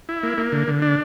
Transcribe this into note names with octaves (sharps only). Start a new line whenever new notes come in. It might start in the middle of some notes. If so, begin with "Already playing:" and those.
E4
A#3
A#3
D3
D3
D4